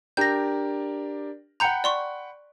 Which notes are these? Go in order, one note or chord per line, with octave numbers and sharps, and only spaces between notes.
D4 G4 A#4 G6 A#6
F#5 G5 A#5 B5 G6 C#7
D5 C6 C#6